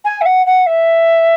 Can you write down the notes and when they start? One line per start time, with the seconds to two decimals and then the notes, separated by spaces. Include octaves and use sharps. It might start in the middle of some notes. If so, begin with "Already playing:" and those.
0.04 G#5
0.21 E5
0.25 F#5
0.46 F#5
0.66 E5